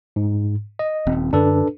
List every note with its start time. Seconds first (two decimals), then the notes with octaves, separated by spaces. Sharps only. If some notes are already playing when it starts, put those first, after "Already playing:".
0.16 G#2
0.79 D#5
1.07 D#1 C4
1.33 F#2 D3 D4 A4 B4